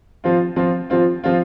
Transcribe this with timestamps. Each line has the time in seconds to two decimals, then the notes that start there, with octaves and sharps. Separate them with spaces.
0.24 F3 C4 F4
0.56 F3 C4 F4
0.90 F3 C4 F4
1.24 F3 C4 F4